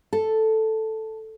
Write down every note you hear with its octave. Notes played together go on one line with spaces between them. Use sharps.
A4